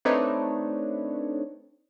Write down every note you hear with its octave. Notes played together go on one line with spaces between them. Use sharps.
A3 C4 D4 D#4 B4 C#5